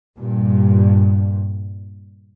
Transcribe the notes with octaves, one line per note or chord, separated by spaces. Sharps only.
G2 A#2